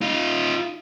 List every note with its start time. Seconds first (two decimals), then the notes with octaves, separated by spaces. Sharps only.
0.01 D#4 F4